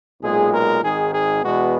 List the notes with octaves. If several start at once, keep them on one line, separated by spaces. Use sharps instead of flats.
B1 A#2 G#3 G#4
A#4
G#1 G#2 D#3 G#4
G#4
E2 B2 G#3 B3 F#4